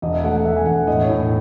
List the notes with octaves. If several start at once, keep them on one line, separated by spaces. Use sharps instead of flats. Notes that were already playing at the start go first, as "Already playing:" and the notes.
E1 D#5
E5
A3 F#5
F#5
E1 E5
G#5
E1 F#5
A2 D#5
C#5
A2